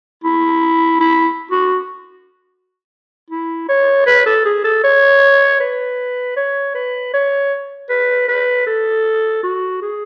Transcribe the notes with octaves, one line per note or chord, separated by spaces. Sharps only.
E4
E4
F#4
E4
C#5
B4
A4
G#4
A4
C#5
B4
C#5
B4
C#5
B4
B4
A4
F#4
G#4